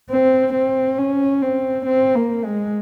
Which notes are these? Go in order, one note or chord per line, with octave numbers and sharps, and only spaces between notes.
C4
C4
C#4
C4
C4
A#3
G#3